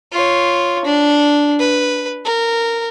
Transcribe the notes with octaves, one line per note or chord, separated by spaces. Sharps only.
F4 C#5
D4
B4
A#4